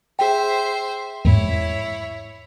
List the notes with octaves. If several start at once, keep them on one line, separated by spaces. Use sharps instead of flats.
G#4 C5 E5 G5
E2 G#2 E4 C#5